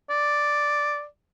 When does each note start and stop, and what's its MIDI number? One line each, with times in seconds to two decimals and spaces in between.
0.10 1.05 74